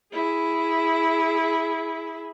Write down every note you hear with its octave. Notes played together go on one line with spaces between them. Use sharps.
E4 G#4